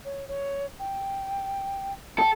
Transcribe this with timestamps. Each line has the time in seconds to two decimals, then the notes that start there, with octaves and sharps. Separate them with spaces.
0.05 C#5
0.28 C#5
0.79 G5
2.19 A4 G5